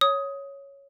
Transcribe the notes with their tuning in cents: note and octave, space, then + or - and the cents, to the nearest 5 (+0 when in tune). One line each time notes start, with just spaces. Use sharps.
C#5 +0 D#6 +15